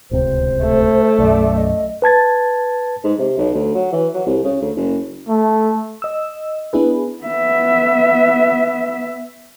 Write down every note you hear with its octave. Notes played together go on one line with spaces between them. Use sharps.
D1 C#2 C3 C5
A3
B1 F#2 D5
D#5
B4 A5 G#6 A6
G#2
C3
B1
D2
F#3
E3
F#3
C2
C#3
D2
F#1
A3
D#5 E6
B3 D4 E4 G#4 B4
B3 E5